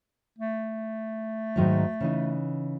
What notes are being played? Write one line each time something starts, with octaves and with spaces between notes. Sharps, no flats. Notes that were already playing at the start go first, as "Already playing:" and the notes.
A3
G#2 D#3 F#3
C#3 E3 D#4